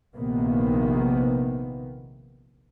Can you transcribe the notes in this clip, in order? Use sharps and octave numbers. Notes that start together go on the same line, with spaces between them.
A#1 C3 D#3 A#3 B3